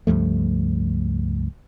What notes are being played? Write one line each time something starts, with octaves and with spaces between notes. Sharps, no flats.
C#2 G2 F3 A3